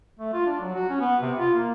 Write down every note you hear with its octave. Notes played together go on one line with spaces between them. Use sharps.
A3
F4
D4
F#3
F#4
C#4
B3
C3
F4
A#3